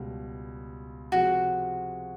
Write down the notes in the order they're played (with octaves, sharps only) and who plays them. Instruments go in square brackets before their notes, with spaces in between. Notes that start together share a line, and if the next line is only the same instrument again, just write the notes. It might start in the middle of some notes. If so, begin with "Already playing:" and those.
Already playing: [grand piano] C#2 B2 G3
[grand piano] C3 F3 G#3 [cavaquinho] F#4